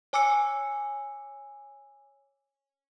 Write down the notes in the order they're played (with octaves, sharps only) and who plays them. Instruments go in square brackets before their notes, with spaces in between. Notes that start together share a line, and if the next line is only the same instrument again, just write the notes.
[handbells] C#5 G#5 D6 E6 C#7